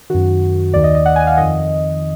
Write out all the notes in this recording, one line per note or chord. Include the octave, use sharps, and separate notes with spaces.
F#2 D#3 F#4
D#2 D#3 D5
D#5
D#5
F#5
G#5
F5
F2 D#3 D#5